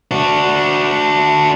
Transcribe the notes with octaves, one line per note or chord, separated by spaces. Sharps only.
D4 F#4